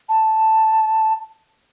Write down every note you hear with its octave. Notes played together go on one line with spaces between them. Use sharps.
A5